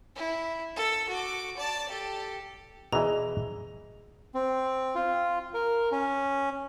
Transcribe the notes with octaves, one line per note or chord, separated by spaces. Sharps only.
E4
A4 E6
F#4 D6
D5 A5
G4 A4
B2 E3 G#4 D5 D#5 A#5
C4
F4
A#4
C#4